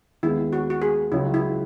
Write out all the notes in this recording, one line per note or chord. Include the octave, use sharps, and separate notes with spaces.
D#2 D#3 G#3 B3 E4
F#4
F#4
G#4
C#2 C#3 F#3 E4
E4